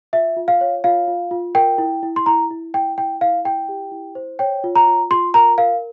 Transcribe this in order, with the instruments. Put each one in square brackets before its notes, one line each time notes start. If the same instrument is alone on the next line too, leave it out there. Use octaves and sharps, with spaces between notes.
[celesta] F4 E5
F4
F5
C#5
F4 F5
F4
F4
A#4 G5
E4
E4
C6
E4 A#5
E4
E4 G5
E4 G5
E4 F5
E4 G5
G4
E4
C5
C#5 G5
F4
A#5
F4
F4 C6
A#4 A#5
A#4 F5